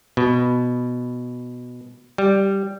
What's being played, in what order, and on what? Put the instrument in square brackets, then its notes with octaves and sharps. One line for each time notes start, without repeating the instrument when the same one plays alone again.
[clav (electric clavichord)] B2
G3